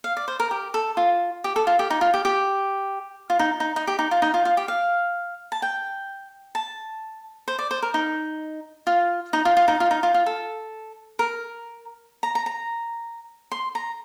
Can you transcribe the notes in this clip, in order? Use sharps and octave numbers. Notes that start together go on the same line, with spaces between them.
F5
D5
C5
A#4
G4
A4
F4
G4
A4
F4
G4
D#4
F4
G4
G4
F4
D#4
D#4
D#4
G4
D#4
F4
D#4
F4
F4
G4
F5
A5
G5
A5
C5
D5
C5
A#4
D#4
F4
D#4
F4
F4
D#4
F4
D#4
F4
F4
A4
A#4
A#5
A#5
A#5
C6
A#5